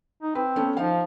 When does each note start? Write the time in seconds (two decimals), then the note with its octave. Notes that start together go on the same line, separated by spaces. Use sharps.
0.22 D#4
0.35 C4 B4
0.56 A3 B3 C#4
0.77 F3 D#4 F5